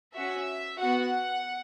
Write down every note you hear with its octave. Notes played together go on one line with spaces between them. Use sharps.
C#4 F#4 E5
B3 F#4 F#5